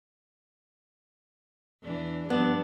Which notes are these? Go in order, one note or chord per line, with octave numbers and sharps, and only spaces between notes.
E2 E3 D4
G2 F3 B3 D4